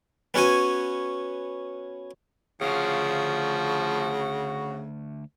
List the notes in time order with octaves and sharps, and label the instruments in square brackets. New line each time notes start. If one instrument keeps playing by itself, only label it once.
[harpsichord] B3 C#4 F#4 C#5 G#5
[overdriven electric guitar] D2 F5 [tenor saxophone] C#3 [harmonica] F3 [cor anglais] F#4